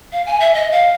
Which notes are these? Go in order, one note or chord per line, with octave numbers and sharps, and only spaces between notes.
F5
G#5
E5
D#5
F5